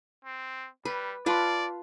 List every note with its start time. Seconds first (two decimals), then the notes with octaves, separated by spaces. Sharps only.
0.25 C4
0.85 G3 B4
1.26 F4 B4 D5 F5 A5 C6